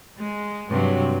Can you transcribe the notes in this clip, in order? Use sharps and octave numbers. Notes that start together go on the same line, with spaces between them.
G#3
G2 C3 F#3